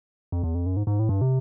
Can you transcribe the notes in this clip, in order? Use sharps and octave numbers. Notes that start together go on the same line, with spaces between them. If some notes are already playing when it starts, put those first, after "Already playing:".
F2
E2
F2
F#2
G#2
G#2
A2
G2
C3